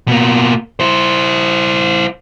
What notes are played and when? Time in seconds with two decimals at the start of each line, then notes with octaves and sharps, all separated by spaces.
0.08 B2 A#3
0.80 E4 C5